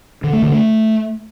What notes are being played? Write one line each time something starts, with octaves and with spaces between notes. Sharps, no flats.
D3
A3
D3
A3